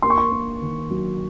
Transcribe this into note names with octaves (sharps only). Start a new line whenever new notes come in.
A#3 C6
C#6
C6
A#3
D#3
F#3